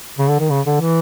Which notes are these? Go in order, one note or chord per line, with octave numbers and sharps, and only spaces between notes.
C#3
D3
D#3
C#3
D3
E3